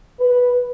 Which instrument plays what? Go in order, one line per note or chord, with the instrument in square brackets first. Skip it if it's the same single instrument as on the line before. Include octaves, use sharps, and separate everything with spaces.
[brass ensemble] B4